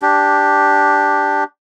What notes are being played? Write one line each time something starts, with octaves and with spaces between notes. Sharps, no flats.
D4 G4